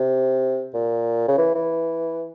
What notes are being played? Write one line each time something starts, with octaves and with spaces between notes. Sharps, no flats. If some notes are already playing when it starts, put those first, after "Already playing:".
Already playing: C3
A#2
C#3
E3
E3